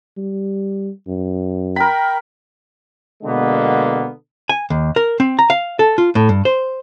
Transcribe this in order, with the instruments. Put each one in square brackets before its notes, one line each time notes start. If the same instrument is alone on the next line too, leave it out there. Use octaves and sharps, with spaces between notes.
[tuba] G3
F#2
[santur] A#4 B5 [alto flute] G5
[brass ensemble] B2 D3 G#3 A#3 B3
[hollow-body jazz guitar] G#5
D#2
A#4
C4
A#5
F5
A4
F4
A2
G2
C5